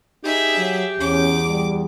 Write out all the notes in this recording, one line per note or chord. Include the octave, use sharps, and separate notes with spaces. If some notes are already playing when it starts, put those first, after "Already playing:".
D#4 G4 G#4 E5
F#3
E2 C#4 D6
G3